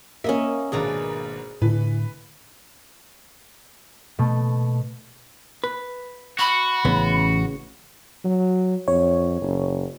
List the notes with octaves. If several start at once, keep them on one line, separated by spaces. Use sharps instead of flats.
A#3 C#4 D#5 E5
G#1 B2 D4 G#4 D5 A#5
A2 D3 E3 B4
B2 A3
B4
F#4 B5
A1 C#3 B3
F#3
F2 C#5
F#1